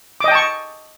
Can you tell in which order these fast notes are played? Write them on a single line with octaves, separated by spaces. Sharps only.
D6 D#5 G5 A5 C#6